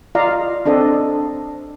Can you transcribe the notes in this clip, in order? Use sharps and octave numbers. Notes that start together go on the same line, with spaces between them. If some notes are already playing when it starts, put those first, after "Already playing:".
F4 D5 D#5 F5 A#5
C4 D4 A4 D#5